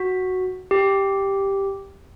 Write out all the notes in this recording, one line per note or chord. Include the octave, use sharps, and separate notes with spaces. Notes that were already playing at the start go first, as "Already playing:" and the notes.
Already playing: F#4
G4